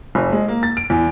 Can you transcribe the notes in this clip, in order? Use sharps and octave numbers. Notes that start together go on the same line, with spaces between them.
F1
G#3
A#3
A6
D7
E2